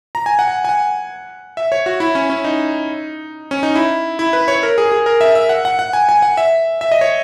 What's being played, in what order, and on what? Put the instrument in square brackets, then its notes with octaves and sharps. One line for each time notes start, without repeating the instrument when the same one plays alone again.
[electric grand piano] A#5
G#5
F#5
G#5
G#5
F#5
E5
C#5
F#4
E4
C#4
C#4
D#4
C#4
D#4
E4
E4
B4
C#5
A#4
G#4
G#4
A#4
E5
E5
F#5
F#5
F#5
G#5
G#5
F#5
E5
E5
D#5
C#5